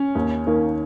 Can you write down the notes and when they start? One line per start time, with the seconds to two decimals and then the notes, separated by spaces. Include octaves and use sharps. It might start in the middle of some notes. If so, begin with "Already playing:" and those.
Already playing: C#4
0.15 D#2
0.47 D#3 A#3